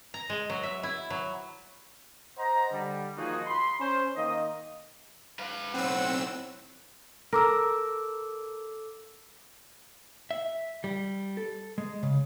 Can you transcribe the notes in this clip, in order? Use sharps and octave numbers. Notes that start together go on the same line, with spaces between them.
A#5
G#3
F#3
E5
E4
F#3
C5 D#5 F#5 A#5
D3 G3
D#3 F3 A#3 D#4 F#4 G#4
B5 C6
C#4 C5
D#3 A#3 D#4 D#5
B4 F5
B1 A2 C4 F#5 E6
A4 A#4 D6 E6
E5
G3
A4
G#3
C#3